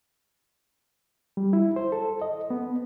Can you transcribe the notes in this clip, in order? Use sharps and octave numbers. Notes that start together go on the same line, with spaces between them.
G3
E4
C5
A4
D#5
B3